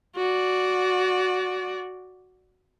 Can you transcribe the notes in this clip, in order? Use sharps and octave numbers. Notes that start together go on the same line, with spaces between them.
F#4 D5